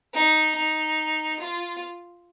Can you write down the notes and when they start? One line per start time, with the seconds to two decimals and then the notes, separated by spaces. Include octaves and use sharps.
0.14 D#4
0.56 D#4
1.40 F4